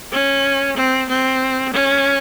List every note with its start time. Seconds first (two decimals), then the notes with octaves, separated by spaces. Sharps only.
0.12 C#4
0.76 C4
1.09 C4
1.73 C#4